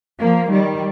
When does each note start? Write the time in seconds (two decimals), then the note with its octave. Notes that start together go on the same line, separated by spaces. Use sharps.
0.19 F3 A#3
0.50 D#3 G3